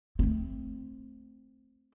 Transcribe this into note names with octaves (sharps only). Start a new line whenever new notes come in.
A3 C4